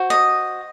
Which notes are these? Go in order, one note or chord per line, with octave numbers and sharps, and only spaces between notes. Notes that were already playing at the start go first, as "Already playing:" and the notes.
Already playing: F#4 C5
D#5